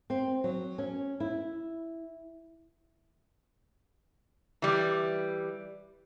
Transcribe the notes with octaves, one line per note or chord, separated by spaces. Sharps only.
C4
F#3
C#4
E4
E3 G3